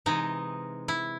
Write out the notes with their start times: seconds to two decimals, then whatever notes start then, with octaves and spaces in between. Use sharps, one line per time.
0.06 C3 E3 G#3 D#4
0.88 E4